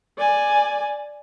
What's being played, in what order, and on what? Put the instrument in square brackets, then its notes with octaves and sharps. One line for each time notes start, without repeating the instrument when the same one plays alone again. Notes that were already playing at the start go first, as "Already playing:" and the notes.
[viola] D5 G#5